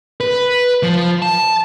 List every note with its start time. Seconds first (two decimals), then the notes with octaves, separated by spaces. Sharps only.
0.20 B4
0.83 F3
1.22 A5